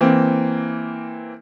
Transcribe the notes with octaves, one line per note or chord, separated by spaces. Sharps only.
E3 A#3 C4